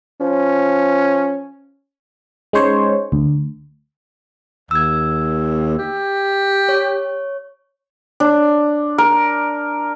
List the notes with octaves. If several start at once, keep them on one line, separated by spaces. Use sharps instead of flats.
F3 C#4
G#3 C#4 D#4 C5 C#5
D2
D#2 E6 G#6
G4
C#5
D4
A#4